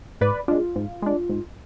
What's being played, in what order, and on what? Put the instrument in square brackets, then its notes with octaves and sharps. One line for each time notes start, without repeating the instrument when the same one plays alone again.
[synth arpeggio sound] G#2 B4 D5
G#3 D4 F4
G#2
G#3 D4
G#2